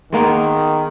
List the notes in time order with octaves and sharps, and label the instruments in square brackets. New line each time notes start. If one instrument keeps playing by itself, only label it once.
[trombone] D#3 [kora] G#3 A#3 B3